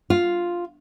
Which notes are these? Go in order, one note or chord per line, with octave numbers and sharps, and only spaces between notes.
F4